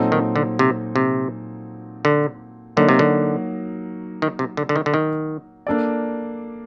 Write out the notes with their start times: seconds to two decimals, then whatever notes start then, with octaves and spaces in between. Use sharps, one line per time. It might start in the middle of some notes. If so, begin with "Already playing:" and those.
Already playing: A#2 F#3 C4 D#4 A4
0.12 D#3
0.36 D3
0.59 C3
0.96 C3
2.05 D3
2.77 D3 F#3 A#3 D#4 F#4
2.89 C3
2.99 D3
4.22 D#3
4.39 C3
4.57 D3
4.69 D3
4.76 D#3
4.86 D3
4.94 D#3
5.67 A#3 D4 A4 D5